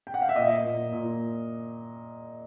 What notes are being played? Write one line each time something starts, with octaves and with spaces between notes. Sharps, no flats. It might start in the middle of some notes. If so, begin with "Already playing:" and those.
G5
F#5
F5
E5
A#2 D#5
A#2
A#2